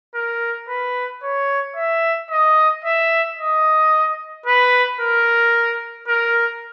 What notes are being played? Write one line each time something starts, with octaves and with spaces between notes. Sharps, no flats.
A#4
B4
C#5
E5
D#5
E5
D#5
B4
A#4
A#4